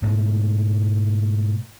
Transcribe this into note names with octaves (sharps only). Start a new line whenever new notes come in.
G#2 B2 G#3 A3